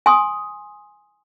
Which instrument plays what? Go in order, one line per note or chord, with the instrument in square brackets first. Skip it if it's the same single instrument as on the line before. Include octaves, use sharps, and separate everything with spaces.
[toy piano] G#5 C6 D#6